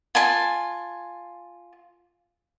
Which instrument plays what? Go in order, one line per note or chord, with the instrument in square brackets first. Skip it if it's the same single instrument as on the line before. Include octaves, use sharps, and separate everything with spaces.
[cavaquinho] F4 G#5 A5